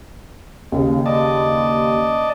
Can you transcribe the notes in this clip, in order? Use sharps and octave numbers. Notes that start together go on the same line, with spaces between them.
D#2 C#3
D5 D#5 A5